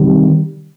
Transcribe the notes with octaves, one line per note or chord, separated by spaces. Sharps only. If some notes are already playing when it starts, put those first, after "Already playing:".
Already playing: C3 D#3 G3